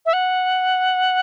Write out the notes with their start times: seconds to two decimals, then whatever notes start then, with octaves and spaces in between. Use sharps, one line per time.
0.06 E5
0.13 F#5